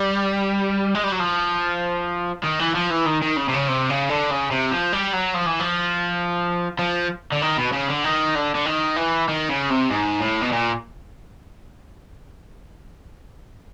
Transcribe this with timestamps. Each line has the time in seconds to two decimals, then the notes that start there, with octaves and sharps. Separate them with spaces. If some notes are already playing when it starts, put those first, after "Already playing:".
Already playing: G3
0.95 G#3
1.04 G3
1.12 F#3
1.20 F3
2.44 D#3
2.60 E3
2.75 F3
2.91 E3
3.06 D#3
3.22 D#3
3.37 C#3
3.49 C3
3.54 C#3
3.68 C3
3.90 C#3
4.10 D3
4.31 C#3
4.51 C3
4.72 F3
4.93 G3
5.13 F#3
5.35 F3
5.47 E3
5.60 F3
6.79 F3
7.32 D3
7.42 D#3
7.58 B2
7.72 C#3
7.89 D3
8.04 D#3
8.35 D3
8.55 D3
8.66 D#3
8.96 E3
9.29 D#3
9.49 C#3
9.70 C3
9.90 G#2
10.21 A2
10.41 B2
10.52 A#2